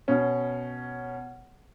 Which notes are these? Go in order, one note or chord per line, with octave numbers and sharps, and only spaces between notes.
B2 C#4